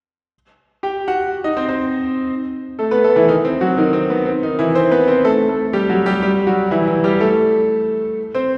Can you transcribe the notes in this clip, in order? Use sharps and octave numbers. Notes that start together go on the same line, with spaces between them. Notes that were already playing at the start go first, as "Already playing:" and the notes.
G4 G5
F#4 F#5
D#4 D#5
C4 C5
C4 C5
A3 A4
B3 B4
A3 A4
E3 E4
D#3 D#4
C4
F#3 F#4
D#3 D#4
C4
B3
C4
D#3 D#4
E3 E4
C4 C5
B3 B4
C4 C5
A3 A4
A3 A4
G3 G4
F#3 F#4
G3 G4
G3 G4
F#3 F#4
E3 E4
E3 E4
G3 G4
A3 A4
C4 C5